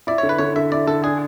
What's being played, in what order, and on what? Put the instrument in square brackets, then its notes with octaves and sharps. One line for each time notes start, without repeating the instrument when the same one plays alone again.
[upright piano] E4 [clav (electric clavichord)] D5
[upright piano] D3 [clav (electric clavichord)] C#5
[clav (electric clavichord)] B4
[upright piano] D3 [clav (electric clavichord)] C#5
[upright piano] D3 [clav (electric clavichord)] E5
[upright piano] E4 [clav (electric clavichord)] D5
[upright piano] D3 [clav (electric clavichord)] A4
[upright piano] D4 [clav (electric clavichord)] G#4